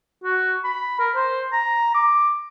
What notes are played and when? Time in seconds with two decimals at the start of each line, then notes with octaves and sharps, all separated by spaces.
0.24 F#4
0.64 B5
0.99 A#4
1.16 C5
1.52 A#5
1.94 D6